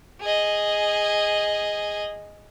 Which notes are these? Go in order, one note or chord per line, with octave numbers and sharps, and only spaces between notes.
G#4 D#5